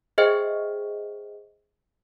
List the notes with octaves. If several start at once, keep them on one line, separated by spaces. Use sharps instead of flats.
G#4 C5 D#5 E5 G5